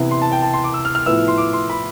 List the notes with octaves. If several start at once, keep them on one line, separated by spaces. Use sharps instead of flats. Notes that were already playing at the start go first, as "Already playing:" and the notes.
Already playing: C3 E3 B3 E4
C6
A5
G5
A5
C6
D6
E6
F6
F6
A2 F3 B3 E4 E6
C6
D6
C6
B5